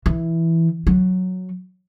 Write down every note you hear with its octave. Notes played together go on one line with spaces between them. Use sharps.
E3
F#3